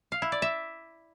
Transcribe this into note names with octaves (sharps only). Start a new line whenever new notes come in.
F5
E4
D5
E5